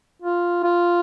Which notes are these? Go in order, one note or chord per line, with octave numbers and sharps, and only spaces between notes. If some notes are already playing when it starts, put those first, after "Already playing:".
F4
F4